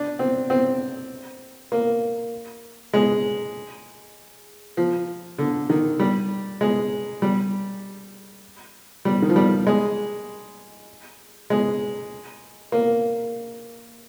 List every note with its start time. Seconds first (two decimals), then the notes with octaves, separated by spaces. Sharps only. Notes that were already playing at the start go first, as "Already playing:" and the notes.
Already playing: D4
0.19 C4
0.50 C4
1.72 A#3
2.93 G#3
4.77 F3
5.38 D3
5.70 D#3
5.99 G3
6.61 G#3
7.22 G3
9.05 G3
9.22 D#3
9.29 F3
9.36 G3
9.67 G#3
11.50 G#3
12.72 A#3